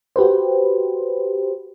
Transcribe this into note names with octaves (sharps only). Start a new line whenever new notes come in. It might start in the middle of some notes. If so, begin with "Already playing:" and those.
F#4 G4 B4 C5